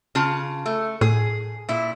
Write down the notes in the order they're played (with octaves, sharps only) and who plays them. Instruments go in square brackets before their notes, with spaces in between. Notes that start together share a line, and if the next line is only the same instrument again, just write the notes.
[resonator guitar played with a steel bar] C#3 F4 A5
A3
[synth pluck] A2 [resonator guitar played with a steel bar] G#4
[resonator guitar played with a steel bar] A#2 E4